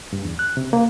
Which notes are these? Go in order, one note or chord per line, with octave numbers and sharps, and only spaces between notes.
G2
E2
F#6
C3
A#3